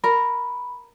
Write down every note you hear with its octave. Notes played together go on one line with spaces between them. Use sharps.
A#4 B5